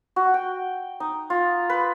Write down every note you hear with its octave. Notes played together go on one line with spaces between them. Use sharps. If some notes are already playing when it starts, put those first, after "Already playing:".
F#4
G5
D#4
F4
B4